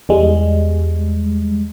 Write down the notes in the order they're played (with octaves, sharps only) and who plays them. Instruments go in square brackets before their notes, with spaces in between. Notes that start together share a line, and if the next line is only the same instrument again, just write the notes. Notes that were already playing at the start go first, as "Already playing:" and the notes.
[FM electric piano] E2 G3 G#3